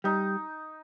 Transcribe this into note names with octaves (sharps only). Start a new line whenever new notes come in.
G3 D#4